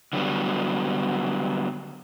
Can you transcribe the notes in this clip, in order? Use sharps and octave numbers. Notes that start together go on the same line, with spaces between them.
D3 F#3 G3 B3